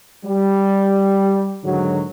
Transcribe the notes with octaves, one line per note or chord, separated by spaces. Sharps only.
G3
G#2 D3 D#3 F#3